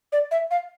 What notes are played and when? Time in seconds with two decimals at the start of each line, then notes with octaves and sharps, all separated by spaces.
0.13 D5
0.31 E5
0.51 F5